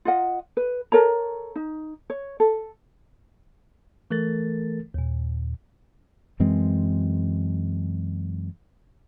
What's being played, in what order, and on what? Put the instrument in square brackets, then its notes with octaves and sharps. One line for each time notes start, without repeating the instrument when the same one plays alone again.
[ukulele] F4 D#5 F#5
B4
A4 A#4 C#5 A#5
D#4
C#5
A4
[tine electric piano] E3 A3 A4 A#4 A6
D#2 A#2
[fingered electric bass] F#2 E3 G#3 C4